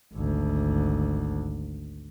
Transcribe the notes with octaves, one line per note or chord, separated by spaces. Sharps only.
G#1 D2